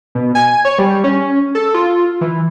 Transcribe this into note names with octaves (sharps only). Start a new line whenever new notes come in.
B2
G#5
C#5
G3
C#4
A4
F4
E3